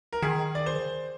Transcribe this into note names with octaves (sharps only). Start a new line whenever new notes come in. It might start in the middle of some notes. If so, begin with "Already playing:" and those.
A#4
D#3 G#4
D5
C5